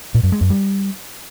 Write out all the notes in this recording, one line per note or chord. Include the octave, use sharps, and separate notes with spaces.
A#2
F#2
G#3
F#2
G3